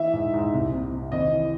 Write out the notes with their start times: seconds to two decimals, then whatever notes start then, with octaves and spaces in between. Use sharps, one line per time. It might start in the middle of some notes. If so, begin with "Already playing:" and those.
Already playing: E3 E5
0.13 G#2
0.34 G#2
0.53 C2
0.73 C3
0.92 C3
1.12 G#1 D#5
1.32 E3